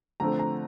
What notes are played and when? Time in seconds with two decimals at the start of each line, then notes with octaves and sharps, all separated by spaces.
0.20 D3 F3 A3 C4 A#5
0.39 A#5